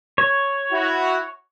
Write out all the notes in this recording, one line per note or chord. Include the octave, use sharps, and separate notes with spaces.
C#5
E4 F#4